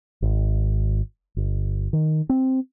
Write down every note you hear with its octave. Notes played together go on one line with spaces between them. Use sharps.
G#1
G1
D#3
C4